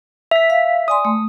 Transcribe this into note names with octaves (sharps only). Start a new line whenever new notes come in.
E5 B6
F5
D5 G#5 C6 D#6
A3